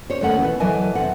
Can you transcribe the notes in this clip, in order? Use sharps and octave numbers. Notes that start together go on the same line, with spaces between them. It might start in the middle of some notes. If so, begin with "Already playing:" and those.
C5 C#5
D#2 A3 C#4 F#5
B2 E3
D3 E3 F#3 D#5 G#5 A5
E2 C3 F#5